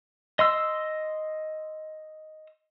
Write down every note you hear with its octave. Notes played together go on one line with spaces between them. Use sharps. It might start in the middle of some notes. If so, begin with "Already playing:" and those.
D#5 C6 E6